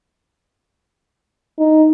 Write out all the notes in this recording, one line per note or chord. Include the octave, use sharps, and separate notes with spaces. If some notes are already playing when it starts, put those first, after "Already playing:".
D#4